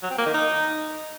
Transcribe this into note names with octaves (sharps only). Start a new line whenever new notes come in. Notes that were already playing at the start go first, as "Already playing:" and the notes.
F#3
C4
A#3
D#3
D#4